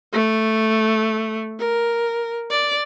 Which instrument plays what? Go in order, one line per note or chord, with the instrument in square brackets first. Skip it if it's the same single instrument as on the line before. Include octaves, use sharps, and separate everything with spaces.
[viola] A3
A#4
D5